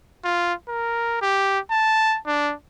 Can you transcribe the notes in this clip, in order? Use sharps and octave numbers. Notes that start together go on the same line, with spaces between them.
F4
A#4
G4
A5
D4